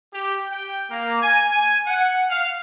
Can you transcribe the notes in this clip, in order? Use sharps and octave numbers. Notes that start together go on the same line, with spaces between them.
G4
G5
A#3
G#5
G#5
F#5
F5